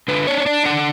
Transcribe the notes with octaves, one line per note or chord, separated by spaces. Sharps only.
D3 B4
D4 C#5
C#5
D4 D5
D3 F#5